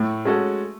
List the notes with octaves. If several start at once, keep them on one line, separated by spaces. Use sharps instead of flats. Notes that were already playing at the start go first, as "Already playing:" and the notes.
Already playing: A2 A3
G#3 C#4 F#4 A4